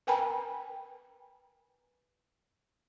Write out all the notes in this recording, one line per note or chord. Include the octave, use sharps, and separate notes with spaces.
A#4 B4 G5 G#5 A#5 B5